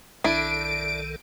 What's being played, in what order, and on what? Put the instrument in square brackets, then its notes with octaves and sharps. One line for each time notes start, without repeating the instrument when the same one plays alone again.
[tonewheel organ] B1 D#3 A4 [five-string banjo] D4 E4 [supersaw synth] D7